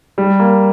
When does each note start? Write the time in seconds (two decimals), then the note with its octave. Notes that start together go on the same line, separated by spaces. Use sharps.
0.18 G3
0.39 A#3